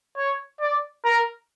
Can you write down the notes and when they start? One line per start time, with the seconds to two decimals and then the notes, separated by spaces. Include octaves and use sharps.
0.17 C#5
0.60 D5
1.04 A#4